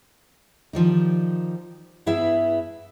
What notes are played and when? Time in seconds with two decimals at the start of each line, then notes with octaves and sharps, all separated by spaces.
0.73 D#3 F3 G3 D#4
2.06 G2 B3 E4 G#4 E5